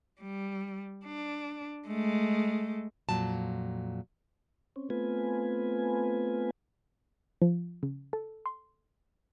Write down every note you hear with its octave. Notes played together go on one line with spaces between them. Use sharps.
G3
D4
G#3 A3
F2 A#2 F#3 A5
C4 C#4
A3 B3 C4 F4 B4 G#5
F3
C#3
A4
C6